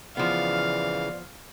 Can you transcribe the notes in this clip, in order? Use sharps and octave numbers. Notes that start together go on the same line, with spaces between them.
C#3 E3 F3 B3 D5 F5